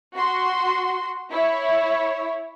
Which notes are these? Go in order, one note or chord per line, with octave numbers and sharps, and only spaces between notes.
F#4 C6
E4 C#5